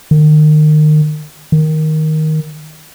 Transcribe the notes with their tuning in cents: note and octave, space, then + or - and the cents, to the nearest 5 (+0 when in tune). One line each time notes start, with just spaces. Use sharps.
D#3 -30
D#3 +5